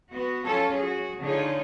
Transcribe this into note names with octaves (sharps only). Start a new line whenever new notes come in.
B3 F#4
F#3 C#4 F4 A4 C#5
F#4 G#4
D3 D#4 F4 G#4 C#5